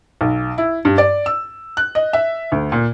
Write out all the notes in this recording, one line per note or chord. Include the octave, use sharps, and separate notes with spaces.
B1
E4
G2
D5
E6
F#6
D#5
E5
D2
A#2